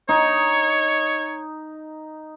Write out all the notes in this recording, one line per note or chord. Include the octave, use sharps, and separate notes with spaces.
D#4 C#5